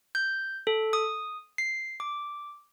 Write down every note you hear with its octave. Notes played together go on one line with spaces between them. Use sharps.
G6
A4
D#6
C7
D6